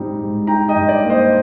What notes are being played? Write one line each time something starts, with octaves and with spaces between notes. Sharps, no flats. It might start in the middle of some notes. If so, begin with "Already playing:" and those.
Already playing: G#2 G3 C4 D#4
G#2
D#4 G5 A#5
D#5 G5
G2
D5
A#3
C5 D#5